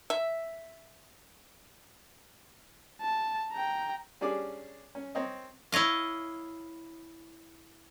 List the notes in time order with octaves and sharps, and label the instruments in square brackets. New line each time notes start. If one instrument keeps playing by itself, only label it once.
[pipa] E5
[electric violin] A5
G5 A#5
[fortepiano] G3 C#4 D4 G#4 D5
C#4
C4 C#5 D#5
[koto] E4 C#5 D#5 F5